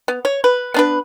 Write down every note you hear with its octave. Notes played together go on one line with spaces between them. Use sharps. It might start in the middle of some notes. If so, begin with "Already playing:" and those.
B3
C#5
B4
B3 D4 B4